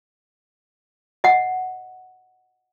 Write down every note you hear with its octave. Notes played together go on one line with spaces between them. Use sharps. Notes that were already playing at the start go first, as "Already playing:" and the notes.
D#5 F#5